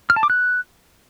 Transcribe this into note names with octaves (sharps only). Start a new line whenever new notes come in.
F6
A5
D6
F#6